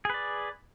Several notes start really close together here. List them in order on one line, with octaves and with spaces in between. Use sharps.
G#4 B4 D5